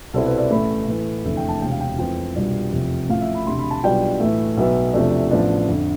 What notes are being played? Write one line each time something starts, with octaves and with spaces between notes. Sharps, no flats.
C2 B2 G3 C4 E4 A4
B4
D5
A1 A2 E3 A3 B5
A2 E3 A3
F1 E2 D3 A3 E4 E5
G5
A5
E1 D2 C3 G5
F5
G5
F2 E3 A3 C4 F4 G5
C2 B2 G3 D4 F4
F1 E2 C3 F3
A1 A2 F3 F5
E5
B5
E1 D2 C3 C6
B5
A5
B1 B2 G3 D4 F4 G5
A2 E3 A3 E5
B1 B2 B3 E5
E2 C3 F3 A3 D4
A1 A2 F3 B3 D4
F2 D3